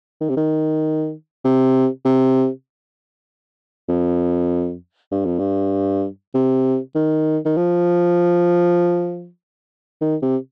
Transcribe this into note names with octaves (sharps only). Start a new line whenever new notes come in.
D#3
C3
D#3
C3
C3
F2
G2
F2
G2
C3
D#3
D#3
F3
D#3
C3